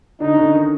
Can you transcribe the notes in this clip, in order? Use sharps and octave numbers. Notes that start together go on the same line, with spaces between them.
D3 D4 D#4
C#4
D3 D4
D#3 D#4